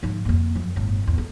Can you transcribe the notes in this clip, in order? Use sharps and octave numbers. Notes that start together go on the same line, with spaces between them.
G#2 F3
F2 A#3
F#2 F3
G1 A2
A1 E2
A3